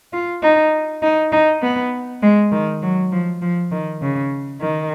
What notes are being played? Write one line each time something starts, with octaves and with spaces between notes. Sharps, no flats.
F4
D#4
D#4
D#4
B3
G#3
D#3
F#3
F3
F3
D#3
C#3
D#3